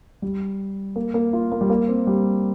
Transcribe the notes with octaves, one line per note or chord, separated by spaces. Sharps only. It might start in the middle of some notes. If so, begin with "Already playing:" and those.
G3
A#3
A#3
F4
A#3
G3
A#3
C4
G3